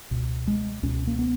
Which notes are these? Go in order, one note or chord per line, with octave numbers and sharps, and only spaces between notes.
C#2 B2
G#3
C#2 B2 C#4
A#3
B3